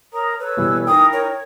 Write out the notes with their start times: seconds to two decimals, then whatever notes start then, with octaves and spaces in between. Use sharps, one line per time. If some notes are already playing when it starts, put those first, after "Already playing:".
0.13 A#4 C#5 A#5 D#6
0.39 A4 B4 C#5 E6
0.57 B2 E3 G3
0.87 D#4 E4 A#4 G5 D#6
1.13 C#5